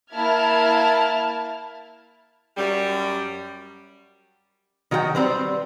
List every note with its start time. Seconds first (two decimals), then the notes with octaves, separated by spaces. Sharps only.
0.12 A#3 E4 A5 F6 G#6
2.57 F#2 G3
4.91 D#3 F#3 F#4 A#4 G5
5.15 G3 C4 B4 C5